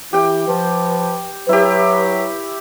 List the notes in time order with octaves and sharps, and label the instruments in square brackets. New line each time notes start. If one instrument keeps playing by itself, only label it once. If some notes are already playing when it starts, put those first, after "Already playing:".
[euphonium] E3 [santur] G4 G5
[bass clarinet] F3 [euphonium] B4
[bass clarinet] F#3 [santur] E4 G4 [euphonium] B4